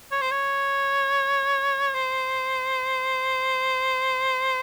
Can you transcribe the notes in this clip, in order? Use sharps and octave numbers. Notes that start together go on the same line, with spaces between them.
C#5
C5
C#5
C5